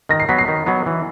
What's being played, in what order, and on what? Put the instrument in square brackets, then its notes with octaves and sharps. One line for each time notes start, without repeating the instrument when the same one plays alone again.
[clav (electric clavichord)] D#3 [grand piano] A#6
[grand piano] C7
[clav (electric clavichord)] F#3 B3 [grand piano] B6
[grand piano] C7
[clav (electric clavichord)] D#3
F#3 B3
E3